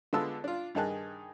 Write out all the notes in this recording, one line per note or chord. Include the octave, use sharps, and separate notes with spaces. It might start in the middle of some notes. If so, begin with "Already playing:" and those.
D3 G#3 B3 F4 A5 E6
D4 F4
G2 D#3 D#4 G#4 A5 F#6